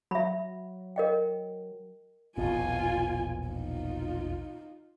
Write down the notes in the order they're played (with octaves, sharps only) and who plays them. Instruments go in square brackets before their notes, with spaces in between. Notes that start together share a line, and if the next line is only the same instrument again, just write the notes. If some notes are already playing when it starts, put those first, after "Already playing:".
[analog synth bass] F#3 [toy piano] E5 B5
[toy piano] A#4 D#5 G5
[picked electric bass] E1 A#1 B2 [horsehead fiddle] F4 G#5
[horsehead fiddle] D#4 F4